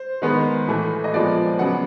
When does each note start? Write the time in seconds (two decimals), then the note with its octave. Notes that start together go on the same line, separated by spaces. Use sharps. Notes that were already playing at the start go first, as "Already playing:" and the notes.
Already playing: C5
0.22 D#3 G#3 B3
0.67 A2 E3 A3
1.04 D#5
1.13 A#2 F3 G#3 B3 D5
1.59 C#3 F#3 B3 F#5